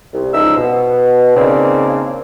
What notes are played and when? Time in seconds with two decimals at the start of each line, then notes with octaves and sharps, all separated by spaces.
0.13 C2
0.33 C#2 F3 G3 D#4 E6
0.57 B2
1.36 C#3 A#3 C4 D4 D#4